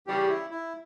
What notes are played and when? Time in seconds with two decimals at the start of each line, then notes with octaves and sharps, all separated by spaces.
0.07 E2 C#3 G3 G4
0.29 E4
0.50 E4